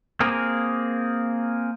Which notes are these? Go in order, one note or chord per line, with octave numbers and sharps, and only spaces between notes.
A#3 C4 G#4 A#4